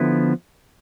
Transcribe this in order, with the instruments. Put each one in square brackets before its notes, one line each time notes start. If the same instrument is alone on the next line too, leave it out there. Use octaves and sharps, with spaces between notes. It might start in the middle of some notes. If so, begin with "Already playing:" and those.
Already playing: [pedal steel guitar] D3 F3 B3 E4